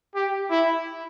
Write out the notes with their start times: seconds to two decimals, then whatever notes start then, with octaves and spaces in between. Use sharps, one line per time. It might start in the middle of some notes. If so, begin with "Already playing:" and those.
0.15 G4
0.50 E4